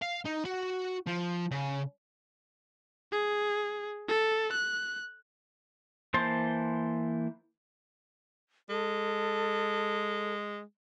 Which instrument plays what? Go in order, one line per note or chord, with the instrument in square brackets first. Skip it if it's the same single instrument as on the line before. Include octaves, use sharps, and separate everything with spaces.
[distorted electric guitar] F5
D#4
F#4
F3
C#3
[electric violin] G#4
A4
F#6
[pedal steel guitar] E3 A#3 C5 A5 C6
[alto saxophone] G#3 [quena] A4